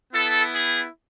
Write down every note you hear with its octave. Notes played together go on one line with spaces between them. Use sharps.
B3 E4 A4
G#4